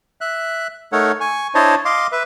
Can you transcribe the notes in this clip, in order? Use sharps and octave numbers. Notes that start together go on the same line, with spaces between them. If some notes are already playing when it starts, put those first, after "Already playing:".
E5 F#6
A3 D#4 A4 A#4 C#5 F#5
G#5 C#6
D4 E4 C5 C#5 D#5 A5
D#5 F5 C6 D6
B4 E5